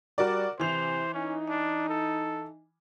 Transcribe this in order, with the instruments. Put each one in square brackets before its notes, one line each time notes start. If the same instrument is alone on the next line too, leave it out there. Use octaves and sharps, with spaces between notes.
[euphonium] G3 [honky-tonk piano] F#4 A#4 D5
[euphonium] C3 [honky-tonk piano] E3 F7 [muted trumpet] C5
[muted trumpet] C#4 [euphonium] D#4
[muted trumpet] D4
A4